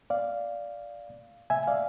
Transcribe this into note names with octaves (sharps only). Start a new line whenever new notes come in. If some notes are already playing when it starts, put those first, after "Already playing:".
D5 F5
E5 G#5
D5 F5